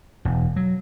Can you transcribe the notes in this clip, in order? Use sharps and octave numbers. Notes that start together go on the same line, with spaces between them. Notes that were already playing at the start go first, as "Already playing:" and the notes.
E1
F#3